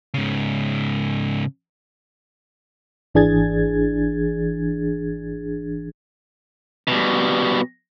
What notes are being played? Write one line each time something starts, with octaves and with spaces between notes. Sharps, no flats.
G#2 C#3
G#1 E3 D4 G#4 G#6 A6
B2 G3